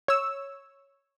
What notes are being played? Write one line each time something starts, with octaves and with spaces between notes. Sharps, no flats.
C#5 E6